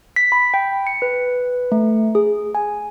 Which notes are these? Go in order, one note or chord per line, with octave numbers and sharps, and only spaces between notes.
B6
B5
G5
C#7
B4
A3
G#4
G#5